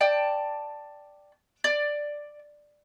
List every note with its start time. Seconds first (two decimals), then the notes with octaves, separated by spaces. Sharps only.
0.01 D5 G5 A5
1.64 D5